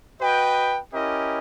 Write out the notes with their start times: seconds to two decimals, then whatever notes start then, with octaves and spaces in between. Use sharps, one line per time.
0.19 F#4 B4 D#5 G5
0.92 C#4 E4 G4 A#4 D#5